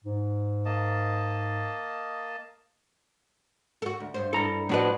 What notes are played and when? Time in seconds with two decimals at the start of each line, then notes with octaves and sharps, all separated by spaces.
0.04 G#2
0.65 A#3 D#5 A5
3.82 F#4 A4
4.00 D2
4.14 G2 B2 C5
4.33 G2 E4 A4 A#5
4.69 A2 F3 D4 F#4 B4 D#5